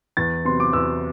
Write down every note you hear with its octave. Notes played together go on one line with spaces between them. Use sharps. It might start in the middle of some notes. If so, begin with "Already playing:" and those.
E2 A6
C3 F#3 B3 C6
D6
E2 E6